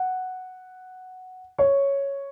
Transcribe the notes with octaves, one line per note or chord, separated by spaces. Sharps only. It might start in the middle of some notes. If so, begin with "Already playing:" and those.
Already playing: F#5
C#5